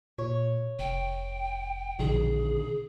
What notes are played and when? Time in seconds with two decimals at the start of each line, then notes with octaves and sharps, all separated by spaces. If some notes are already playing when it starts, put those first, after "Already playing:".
0.18 A#2 C#5
0.79 F1 G5
1.99 A#1 B2 D3 D#3 G#4